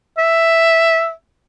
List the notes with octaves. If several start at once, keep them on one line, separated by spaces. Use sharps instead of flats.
E5